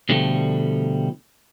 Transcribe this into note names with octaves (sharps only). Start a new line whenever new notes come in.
B2 D3 F3 G3 A3